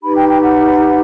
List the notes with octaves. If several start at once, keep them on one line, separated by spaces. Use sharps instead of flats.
D#4 G4 B4 B5
G5
G5
F#5